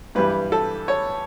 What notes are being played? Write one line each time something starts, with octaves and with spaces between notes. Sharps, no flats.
G2 E3 G3 B4
A4
C#5